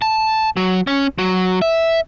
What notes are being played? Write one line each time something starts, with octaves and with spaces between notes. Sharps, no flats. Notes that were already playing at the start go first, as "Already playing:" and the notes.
A5
F#3
C#4
F#3
E5